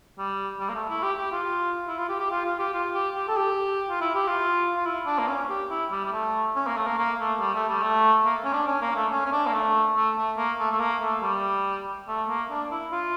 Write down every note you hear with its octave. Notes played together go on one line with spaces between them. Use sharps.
G3
G3
A#3
A3
E4
G4
G4
F4
E4
F4
G4
G4
F4
F4
G4
F4
G4
G4
A4
G4
F4
E4
G4
F4
F4
E4
D4
A#3
C#4
G4
E4
G3
G3
A3
C#4
A#3
A3
A#3
A#3
A3
G3
A3
G3
A3
A#3
C#4
D4
C#4
A#3
A3
C#4
C#4
D4
A#3
A3
A3
A3
A#3
A3
A3
A#3
A3
G3
A3
A#3
D4
E4
F4